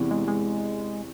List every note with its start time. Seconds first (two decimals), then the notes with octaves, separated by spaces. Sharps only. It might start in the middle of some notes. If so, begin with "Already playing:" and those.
Already playing: E2 C3 E3
0.11 G#3
0.28 G#3